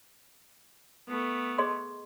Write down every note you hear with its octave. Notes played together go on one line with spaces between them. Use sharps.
A3 B3
G#4 D#5 C6